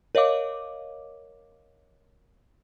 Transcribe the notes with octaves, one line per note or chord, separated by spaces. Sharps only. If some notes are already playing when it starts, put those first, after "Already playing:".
A#4 C#5 D#5 F5 D6